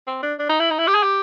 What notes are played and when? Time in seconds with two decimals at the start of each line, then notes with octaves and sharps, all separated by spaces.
0.07 C4
0.23 D4
0.39 D4
0.49 D#4
0.60 E4
0.71 D#4
0.79 E4
0.87 G4
0.95 G#4
1.03 G4